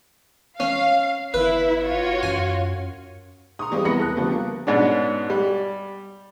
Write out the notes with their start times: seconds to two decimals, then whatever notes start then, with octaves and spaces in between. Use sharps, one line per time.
0.60 C#4 F5
1.34 G1 E4 B4 E5
1.83 F4 F#4 C#5
2.23 F#2 G#5
3.59 A#5 C6 C#6 D#6
3.71 E3 G3 G#3 A#3 C4
3.85 E2 E4 B4 B5 A#6 C#7
3.99 A4 F#6
4.16 D3 F3 G3 A3 B3
4.32 A#3
4.67 G#2 B2 B3 C#4 D4
5.30 G3